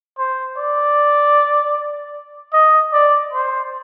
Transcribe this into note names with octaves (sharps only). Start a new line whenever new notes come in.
C5
D5
D#5
D5
C5